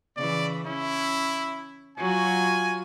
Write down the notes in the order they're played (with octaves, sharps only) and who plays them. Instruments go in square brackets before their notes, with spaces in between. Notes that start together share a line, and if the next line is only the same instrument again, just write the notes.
[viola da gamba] C#3 E3 [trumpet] D5
[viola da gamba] C#4 [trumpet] E4
[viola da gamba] F#3 F4 F#4 [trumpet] G#5